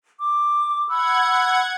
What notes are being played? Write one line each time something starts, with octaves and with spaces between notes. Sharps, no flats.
D6
F#5 B5 E6 G#6